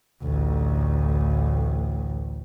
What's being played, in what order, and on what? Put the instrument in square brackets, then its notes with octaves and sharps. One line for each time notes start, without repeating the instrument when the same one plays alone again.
[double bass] A1 D2